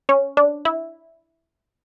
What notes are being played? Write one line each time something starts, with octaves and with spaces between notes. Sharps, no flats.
C#4
D4
E4